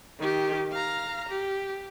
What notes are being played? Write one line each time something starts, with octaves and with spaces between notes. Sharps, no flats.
D#3 G4
F5 A#5
G4